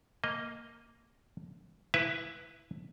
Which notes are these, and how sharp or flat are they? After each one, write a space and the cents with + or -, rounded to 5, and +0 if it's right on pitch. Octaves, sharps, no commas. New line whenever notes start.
A#3 +0 D#5 +0
E4 -5 B4 +0 E5 +25